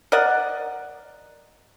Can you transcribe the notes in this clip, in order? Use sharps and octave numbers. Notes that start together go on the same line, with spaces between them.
A#4 D5 D#5 F#5